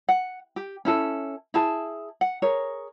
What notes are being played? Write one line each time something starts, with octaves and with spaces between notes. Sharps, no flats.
F#5
G4
C#4 E4 A4
E4 G#4 A5
F#5
G#4 A#4 C#5